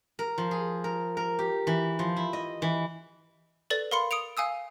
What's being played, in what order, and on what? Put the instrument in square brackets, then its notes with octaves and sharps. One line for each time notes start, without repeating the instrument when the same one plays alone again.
[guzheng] A#4
F3
G#4
A#4
A#4
G4
E3
F3
E4
D#5
E3
[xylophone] A4 B4 D5 A6
A#4 F5 B5 C6 C#7 G7
D#6 C#7 D7 F7
F5 G#5 D#6 E6